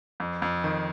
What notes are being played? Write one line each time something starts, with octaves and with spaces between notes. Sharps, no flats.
F2
F2
D#3